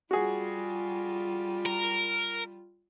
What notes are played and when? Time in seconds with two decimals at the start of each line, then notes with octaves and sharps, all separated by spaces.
0.11 G3 F4 F#4 G#4
1.65 A#4